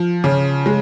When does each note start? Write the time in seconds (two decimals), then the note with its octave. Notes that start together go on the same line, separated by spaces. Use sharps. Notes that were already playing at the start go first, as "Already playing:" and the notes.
Already playing: F3
0.24 C#3
0.66 G#3